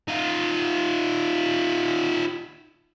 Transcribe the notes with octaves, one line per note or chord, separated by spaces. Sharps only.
D#4 F4